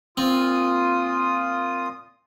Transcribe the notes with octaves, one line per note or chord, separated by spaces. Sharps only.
A#2 C4 F4 D#6